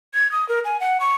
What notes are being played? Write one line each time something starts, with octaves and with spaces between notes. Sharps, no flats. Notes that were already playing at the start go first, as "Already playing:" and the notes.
G#6
D#6
A#4
G#5
F#5
C#6